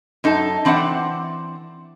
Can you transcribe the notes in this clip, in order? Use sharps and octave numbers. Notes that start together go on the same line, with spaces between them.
F#2 D#4 A4 A5
E3 C4 D4 E5 F#5